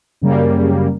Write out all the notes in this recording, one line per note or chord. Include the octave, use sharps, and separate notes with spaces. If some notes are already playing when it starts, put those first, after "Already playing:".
F#2 C#3 G3 A#3